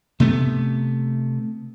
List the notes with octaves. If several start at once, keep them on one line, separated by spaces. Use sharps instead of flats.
C3 A3 B3